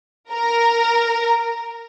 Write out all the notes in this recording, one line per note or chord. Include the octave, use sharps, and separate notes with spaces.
A#4 A#5